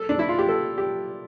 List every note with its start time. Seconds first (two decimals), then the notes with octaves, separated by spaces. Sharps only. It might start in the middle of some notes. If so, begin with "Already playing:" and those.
Already playing: A4
0.09 D4
0.19 E4
0.29 F4
0.39 G4
0.49 A4
0.78 G4